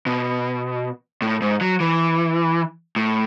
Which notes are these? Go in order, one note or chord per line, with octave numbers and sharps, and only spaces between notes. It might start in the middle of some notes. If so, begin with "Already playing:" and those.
B2
A2
G#2
F#3
E3
A2